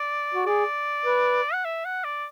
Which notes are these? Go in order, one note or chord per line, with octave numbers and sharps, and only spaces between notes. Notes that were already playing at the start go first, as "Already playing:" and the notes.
Already playing: D5
F#4
G#4 D5
B4
F#5
E5
F#5
D5